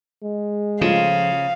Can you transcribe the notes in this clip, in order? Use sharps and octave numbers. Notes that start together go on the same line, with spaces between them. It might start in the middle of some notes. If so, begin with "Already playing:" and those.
G#3
C#3 F3 A3 F4 F5